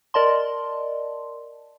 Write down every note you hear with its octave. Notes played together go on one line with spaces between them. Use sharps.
A#4 D5 D#5 A5 C6